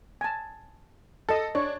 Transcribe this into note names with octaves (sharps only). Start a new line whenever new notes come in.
G#5 A5
A4 D#5 A5
D4 C#5